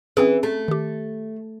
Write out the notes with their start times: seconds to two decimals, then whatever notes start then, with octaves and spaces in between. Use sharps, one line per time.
0.17 E3 C4 C#4 G#4
0.43 A3
0.68 D#3 G4